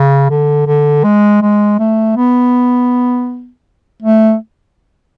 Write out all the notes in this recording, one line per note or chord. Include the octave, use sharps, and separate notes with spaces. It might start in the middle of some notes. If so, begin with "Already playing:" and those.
Already playing: C#3
D3
D3
G#3
G#3
A3
B3
A3